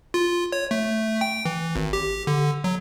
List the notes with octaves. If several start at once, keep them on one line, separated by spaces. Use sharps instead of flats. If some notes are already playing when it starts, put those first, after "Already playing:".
F4
C#5
A3
G5
E3
G#1
G4
D3
F#3